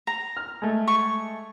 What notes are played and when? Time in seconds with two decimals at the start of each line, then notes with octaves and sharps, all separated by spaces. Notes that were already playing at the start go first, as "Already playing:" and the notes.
0.07 A#5
0.37 F6
0.62 G#3 A3
0.88 C#6